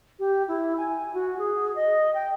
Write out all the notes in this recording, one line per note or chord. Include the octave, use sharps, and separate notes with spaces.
G4
E4
G#5
F#4
G#4
D#5
G5